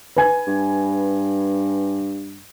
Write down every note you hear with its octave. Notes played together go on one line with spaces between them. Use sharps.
B4 G#5 G#6
G2